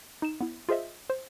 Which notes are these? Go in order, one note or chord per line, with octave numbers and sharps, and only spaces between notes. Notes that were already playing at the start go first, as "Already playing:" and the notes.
D#4 E7
B3 E4
F4 G#4 C5 D#5 E5
C5